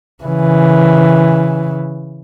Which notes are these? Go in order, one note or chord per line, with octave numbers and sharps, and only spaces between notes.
C#3 E3